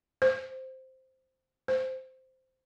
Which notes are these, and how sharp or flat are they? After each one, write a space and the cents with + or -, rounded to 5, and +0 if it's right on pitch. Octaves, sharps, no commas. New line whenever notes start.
C5 +0
C5 -5